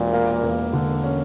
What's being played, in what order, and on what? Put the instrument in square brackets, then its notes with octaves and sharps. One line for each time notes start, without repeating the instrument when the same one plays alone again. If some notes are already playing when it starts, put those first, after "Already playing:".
Already playing: [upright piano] E1 [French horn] A#2
[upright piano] A#3
E2
D3
C#4